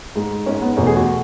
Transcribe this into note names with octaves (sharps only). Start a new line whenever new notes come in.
G#2 G#3
G#2 G#3 C#4
B3
E2 B2 A3 C#4
G#4
F#4